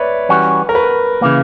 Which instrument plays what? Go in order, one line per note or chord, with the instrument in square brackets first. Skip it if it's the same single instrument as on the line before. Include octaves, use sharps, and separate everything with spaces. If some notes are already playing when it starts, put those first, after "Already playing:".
Already playing: [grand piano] B4 C#5 D5 E5
[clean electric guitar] E3 G3 C#4 F#4
[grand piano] A#4
B4
[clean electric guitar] C#3 E3 A#3